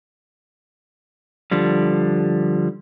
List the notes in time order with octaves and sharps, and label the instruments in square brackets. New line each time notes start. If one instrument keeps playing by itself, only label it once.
[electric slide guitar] D3 F3 G3